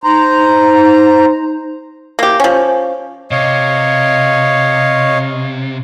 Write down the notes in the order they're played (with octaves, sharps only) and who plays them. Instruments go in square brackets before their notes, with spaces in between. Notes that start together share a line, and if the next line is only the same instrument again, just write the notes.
[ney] D#4 [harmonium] C5 A#5
[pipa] A#3 G4
F3 C#4
[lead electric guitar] C3 [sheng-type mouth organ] C#5 D#5 F5